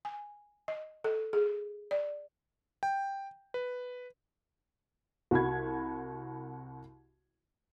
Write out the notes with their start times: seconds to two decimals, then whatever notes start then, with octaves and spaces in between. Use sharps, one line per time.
0.05 G#5
0.68 D#5
1.04 A4
1.33 G#4
1.91 D5
2.83 G5
3.54 B4
5.31 C2 F#4 B5 G#6